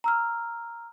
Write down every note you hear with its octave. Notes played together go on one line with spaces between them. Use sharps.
A#5 E6 F6